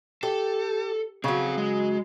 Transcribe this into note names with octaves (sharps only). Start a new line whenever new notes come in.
G4 A4
C#3 F#3 C4 F5
G#3